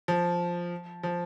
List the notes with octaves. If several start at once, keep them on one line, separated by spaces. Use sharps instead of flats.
F3
F3